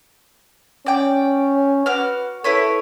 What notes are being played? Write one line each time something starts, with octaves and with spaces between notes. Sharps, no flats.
C#4 D5 G5
F#4 B4 D6 F6
E4 A4 B4 C#5